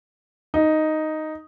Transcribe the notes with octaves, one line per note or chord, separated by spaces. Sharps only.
D#4